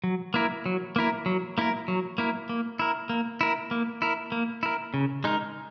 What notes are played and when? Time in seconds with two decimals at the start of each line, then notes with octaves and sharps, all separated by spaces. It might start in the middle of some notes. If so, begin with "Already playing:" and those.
0.04 F#3
0.34 A#3 E4 A#4
0.66 F#3
0.96 A#3 E4 A#4
1.26 F#3
1.58 A#3 E4 A#4
1.88 F#3
2.18 A#3 E4 A#4
2.49 A#3
2.79 E4 A#4
3.10 A#3
3.41 E4 A#4
3.71 A#3
4.02 E4 A#4
4.32 A#3
4.63 E4 A#4
4.94 C#3
5.24 G#3 D#4 A#4